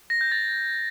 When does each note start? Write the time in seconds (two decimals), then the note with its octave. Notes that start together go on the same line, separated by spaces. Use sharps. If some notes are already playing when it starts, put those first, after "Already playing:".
0.10 A#6
0.21 G6
0.32 A6